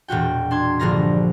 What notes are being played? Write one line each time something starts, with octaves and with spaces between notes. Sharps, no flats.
E1 A#2 F#4 G5
D4 C6 G#6
A#1 G2 D3 F3 A#4 A#6